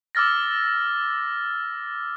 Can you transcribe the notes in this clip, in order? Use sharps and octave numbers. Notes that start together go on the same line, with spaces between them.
D6 E6 F6 A6 A#6